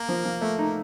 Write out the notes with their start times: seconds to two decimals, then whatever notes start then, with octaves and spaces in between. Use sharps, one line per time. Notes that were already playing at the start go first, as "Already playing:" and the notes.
Already playing: A#3 A#4
0.09 F3
0.25 F3
0.41 A3
0.59 D#4